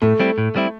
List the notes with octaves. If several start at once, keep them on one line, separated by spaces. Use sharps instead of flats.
A2 A3
G3 C4 E4
A2
G3 C4 E4